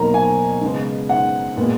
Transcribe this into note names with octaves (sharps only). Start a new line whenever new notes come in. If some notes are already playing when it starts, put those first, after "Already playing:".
Already playing: B2 F#3 A#3 A#5
G#5
C#3 G#3 B3
F#5
A#2 G#3 B3